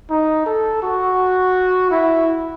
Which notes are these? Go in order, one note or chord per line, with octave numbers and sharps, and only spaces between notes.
D#4
A4
F#4
E4